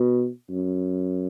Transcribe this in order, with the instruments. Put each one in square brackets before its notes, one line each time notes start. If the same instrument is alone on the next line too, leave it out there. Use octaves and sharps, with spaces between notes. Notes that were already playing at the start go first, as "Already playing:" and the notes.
Already playing: [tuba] B2
F#2